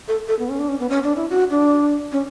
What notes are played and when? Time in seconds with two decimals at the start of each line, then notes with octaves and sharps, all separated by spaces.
0.08 A4
0.28 A4
0.39 B3
0.49 C#4
0.59 D4
0.69 C#4
0.80 B3
0.90 C#4
1.03 D4
1.16 E4
1.30 F#4
1.50 D4
2.12 C#4